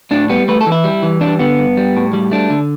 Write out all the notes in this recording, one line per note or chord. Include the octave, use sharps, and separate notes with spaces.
A2 D4
G3 B3
A3 B4
A4
E3
E4
G3
E3
G3 D4
D3 B3
G2
G3
A2
G3
A3 D4
D3